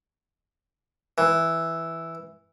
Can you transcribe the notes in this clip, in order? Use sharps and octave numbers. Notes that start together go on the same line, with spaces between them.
E3